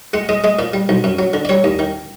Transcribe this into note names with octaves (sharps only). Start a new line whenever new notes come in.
G#3 F#5
G#3 D#5
G#3 D#5
A#2 D5
G3
B1
F#2
F#3
D3
D5
G3 C#5
D#2
D#3